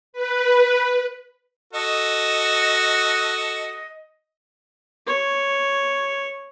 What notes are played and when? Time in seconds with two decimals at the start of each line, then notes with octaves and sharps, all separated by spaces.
0.13 B4
1.73 F#4 A4 D#5
5.07 C#5